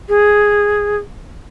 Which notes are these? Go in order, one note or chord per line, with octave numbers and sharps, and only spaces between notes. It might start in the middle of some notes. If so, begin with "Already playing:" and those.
G#4